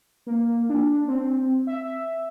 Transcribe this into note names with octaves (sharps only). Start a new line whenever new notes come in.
A#3
D4
C4
E5